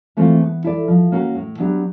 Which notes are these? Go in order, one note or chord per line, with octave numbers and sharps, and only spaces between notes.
E3 A3 C4 F4
B3
E4 A4 D5
F3
A#3 C#4 F#4 A#4
A2
F#3 B3 D4 G4